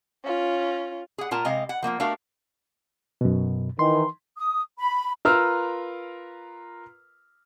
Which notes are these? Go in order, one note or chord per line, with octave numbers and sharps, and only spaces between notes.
C#4 F4
G#4 F#5
A#2 F4 A#4 A5 A#5
C3 G#3 D#5 F5
F#5
F3 A#3 D#4 F4
A3 D4 F#4 G4 A#4 F5
F#2 B2
D#3 E3 C6
D#6
B5
F4 A#4 B4 A#5 E6 F6